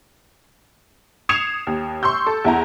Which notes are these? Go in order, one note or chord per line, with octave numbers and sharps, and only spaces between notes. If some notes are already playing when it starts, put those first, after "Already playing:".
D#6 G#6 C7 C#7 E7 F7
D#2
C6 C#6 E6 G6
A4
E2 E4 A#5